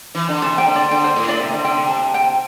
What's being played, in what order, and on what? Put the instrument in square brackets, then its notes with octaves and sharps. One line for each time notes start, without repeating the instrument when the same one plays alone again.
[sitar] E3
D3
[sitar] C3 [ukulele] A5
[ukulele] G5
[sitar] D3
[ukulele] D5
[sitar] D3 [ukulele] G5
[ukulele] C5
[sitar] A2
[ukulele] D5
[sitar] C3 [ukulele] E5
[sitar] D3
[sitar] D3 [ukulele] G5
[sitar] C3
[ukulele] A5
G5